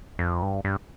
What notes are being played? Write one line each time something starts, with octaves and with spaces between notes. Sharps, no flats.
F2
G2
G2